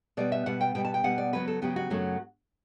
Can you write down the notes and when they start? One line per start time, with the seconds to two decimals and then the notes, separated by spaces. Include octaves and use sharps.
0.17 B2 G3 B3 D5
0.32 E5
0.46 B2 G3 B3 F#5
0.61 G5
0.75 B2 G3 B3 G5
0.85 A5
0.94 G5
1.04 B2 G3 B3 F#5
1.18 D5
1.33 C#3 F#3 B3 B4
1.48 A4
1.62 C#3 F#3 B3 G4
1.76 F#4
1.90 F#2 C#3 F#3 A3 C#4